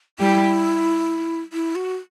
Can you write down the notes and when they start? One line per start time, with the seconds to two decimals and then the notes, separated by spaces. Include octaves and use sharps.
0.19 G3 E4 G4
1.53 E4
1.75 F#4